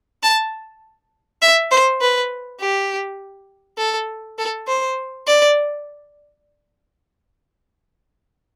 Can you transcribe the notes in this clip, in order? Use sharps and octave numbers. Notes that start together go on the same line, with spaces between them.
A5
E5
C5
B4
G4
A4
A4
C5
D5